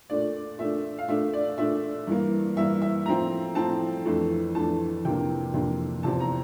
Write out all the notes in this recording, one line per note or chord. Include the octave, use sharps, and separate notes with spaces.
A#2 A3 D4 D5
A#2 A3 D4 E5
F5
A#2 A3 D4 E5
D5
A#2 A3 D4 E5
G2 E3 A#3
G2 E3 A#3 E5
E5
A2 F3 C4 A#5
A2 F3 C4 A5
F2 E3 A3 D4
F2 E3 A3 D4 A5
F2 C3 E3 A#3 D4 G5
F2 C3 E3 A#3 D4
E2 C3 F3 C4 A5
A#5